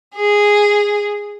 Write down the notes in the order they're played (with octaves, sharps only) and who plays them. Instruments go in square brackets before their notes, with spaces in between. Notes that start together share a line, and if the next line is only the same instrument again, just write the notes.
[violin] G#4